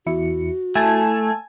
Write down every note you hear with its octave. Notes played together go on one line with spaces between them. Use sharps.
E2 E4 F#4 C#7
A3 E4 G#5 A5 G#6